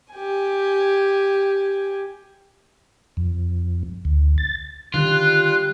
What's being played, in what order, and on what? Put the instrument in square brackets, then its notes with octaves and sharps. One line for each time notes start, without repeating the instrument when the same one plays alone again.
[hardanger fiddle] G4 G#5
[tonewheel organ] F2
D2
A6
[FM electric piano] D3 D#3 [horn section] G3 [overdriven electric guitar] F4 [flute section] F#6